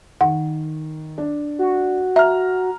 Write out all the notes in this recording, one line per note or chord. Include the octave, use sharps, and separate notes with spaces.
D#3 F#5
D4
F#4
E5 A#5 F6